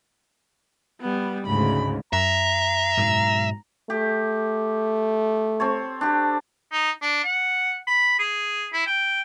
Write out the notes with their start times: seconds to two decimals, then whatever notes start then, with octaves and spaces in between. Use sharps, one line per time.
1.00 G3 B3
1.46 D2 G#2 C#3 B5
2.13 F#2 E5 A#5
2.97 G#2 B2 F#3
3.90 A3 G4
5.60 C4 A4 C#5
6.01 D4 G4
6.73 D#4
7.02 D4
7.24 F#5
7.87 B5
8.19 G#4
8.73 E4
8.86 G5